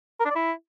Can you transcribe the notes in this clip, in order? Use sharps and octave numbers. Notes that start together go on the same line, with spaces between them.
A#4
D4
D5
E4